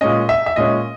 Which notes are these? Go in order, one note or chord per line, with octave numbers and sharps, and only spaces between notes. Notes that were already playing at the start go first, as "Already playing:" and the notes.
A#2 G#3 C#4 D#5
E5
E5
A#2 G#3 C#4 D#5